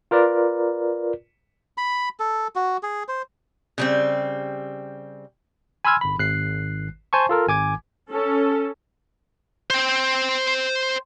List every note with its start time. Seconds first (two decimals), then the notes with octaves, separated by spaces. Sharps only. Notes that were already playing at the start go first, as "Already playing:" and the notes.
0.11 F4 A#4 B4 D5
1.78 B5
2.20 A4
2.56 F#4
2.83 G#4
3.08 C5
3.78 C#3 G3 C4
5.85 G#5 B5 C6 E6 F6 G#6
6.01 G1 B5
6.19 G#1 F#6 C7
7.13 C5 G#5 A5 C#6
7.29 F4 A4 A#4
7.47 G#1 G#5 D6 G#6
8.11 C#4 A4
9.70 C5 G5